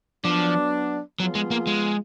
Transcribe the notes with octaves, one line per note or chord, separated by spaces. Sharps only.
F3 F#3 B3 D4
F3 F#3 B3 F4 G#4
G#3
A#3
G#3